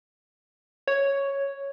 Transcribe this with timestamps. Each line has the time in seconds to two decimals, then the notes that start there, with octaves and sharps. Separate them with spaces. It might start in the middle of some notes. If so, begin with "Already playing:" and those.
0.87 C#5